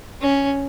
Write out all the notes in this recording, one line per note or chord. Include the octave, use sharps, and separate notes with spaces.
C#4